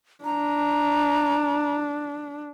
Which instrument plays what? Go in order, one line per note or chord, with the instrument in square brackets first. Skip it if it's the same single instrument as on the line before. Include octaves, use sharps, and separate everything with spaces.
[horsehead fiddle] D4 [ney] A#5